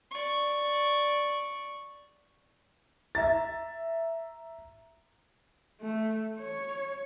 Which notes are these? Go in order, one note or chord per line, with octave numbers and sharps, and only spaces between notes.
D5 C#6
E5 A#5 A6
A3
C#5